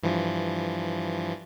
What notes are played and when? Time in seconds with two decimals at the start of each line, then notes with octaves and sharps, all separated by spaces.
0.03 G2 E3 F3